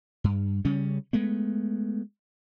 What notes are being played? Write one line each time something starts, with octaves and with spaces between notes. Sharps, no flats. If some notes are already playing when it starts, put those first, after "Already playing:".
G2
C#3 G3 C#4
G#3 A3 B3